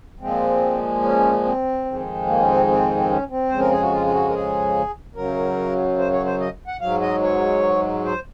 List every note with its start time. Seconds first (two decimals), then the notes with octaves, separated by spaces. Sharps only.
0.20 A#2 F3 G#3 C4
1.03 C#4
1.44 C4
1.85 F2 D#3 G#3
2.27 A#3
2.40 C#4
2.47 C4
2.68 C4
2.97 C4
3.09 C#4
3.30 C4
3.49 F2 C#3 G#3 C5
3.59 A#4
3.71 G#4
3.81 F#4
3.92 F4
4.07 F4
4.13 F#4
4.29 A#4
4.34 G#4
5.16 F#2 C#3 F#3 A#4
5.98 C5
6.13 C#5
6.26 C5
6.40 D#5
6.67 F#5
6.81 G#2 F#3 F5
7.01 D#5
7.22 C#5
8.05 C5